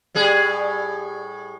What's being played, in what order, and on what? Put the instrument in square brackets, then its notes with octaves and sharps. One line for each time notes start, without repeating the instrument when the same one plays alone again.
[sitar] A2 G3 G#4